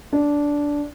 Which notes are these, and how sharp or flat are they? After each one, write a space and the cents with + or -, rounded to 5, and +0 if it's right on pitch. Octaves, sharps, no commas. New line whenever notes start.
D4 -10